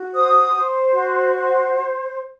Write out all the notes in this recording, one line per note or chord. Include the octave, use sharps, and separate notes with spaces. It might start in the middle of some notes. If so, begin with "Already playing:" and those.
Already playing: F#4
C5 D#6
C5
F#4
C5